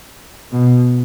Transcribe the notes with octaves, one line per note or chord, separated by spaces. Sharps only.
B2